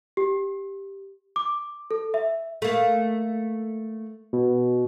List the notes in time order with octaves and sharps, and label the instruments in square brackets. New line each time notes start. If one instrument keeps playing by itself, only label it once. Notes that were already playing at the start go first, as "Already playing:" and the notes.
[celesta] G4
D6
A4
E5
[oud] A3 A#3
[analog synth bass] B2